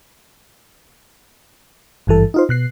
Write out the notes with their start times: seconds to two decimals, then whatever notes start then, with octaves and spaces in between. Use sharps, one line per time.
2.07 G#1 G2 E3 A4
2.34 D#4 F4 C5
2.49 B2 F#6 C7